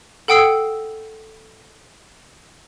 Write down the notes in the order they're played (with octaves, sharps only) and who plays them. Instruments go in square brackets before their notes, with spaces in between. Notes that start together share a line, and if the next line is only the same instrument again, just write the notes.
[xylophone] A4 F#5 G5 D#6 E6 C7